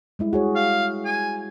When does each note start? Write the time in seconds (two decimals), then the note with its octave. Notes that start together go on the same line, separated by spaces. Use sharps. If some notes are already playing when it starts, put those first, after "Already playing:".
0.19 G3 G#3 E4
0.33 F#4 G#4 C#5
0.56 F5
1.05 G#5